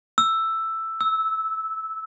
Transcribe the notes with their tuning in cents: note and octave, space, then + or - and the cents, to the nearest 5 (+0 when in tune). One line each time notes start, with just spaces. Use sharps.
E6 +5
E6 -15